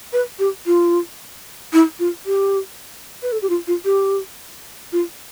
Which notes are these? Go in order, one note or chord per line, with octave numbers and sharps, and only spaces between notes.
B4
G4
F4
E4
F4
G4
B4
A4
G4
F4
F4
G4
F4